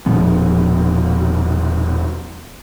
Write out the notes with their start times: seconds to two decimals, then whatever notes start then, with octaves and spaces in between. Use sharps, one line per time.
0.06 E1 A#2 F3 B3